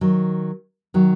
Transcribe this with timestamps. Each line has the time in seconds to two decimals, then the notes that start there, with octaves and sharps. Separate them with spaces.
0.01 D#3 F#3
0.94 D#3 F#3